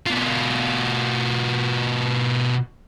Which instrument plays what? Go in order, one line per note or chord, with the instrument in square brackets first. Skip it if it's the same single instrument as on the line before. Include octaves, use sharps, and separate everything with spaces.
[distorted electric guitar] B2 F4